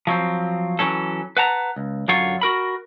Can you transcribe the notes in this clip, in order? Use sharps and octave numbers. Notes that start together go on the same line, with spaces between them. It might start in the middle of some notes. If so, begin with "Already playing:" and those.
F3 F#3 C4
E3 F#3 C#4 A4
B4 F#5 A5 A#5
C#2
F#2 D3 F#3 F4 C#5
F#4 A#4 B5